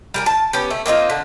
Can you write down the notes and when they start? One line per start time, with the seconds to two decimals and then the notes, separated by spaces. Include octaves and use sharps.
0.14 G3 A#4 G#5
0.26 A5
0.53 B3 C#4 G4
0.71 A3
0.86 A#3 C4 D#4 F4
1.10 D3